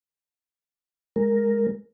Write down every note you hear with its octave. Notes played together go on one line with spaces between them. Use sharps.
G#3 A#4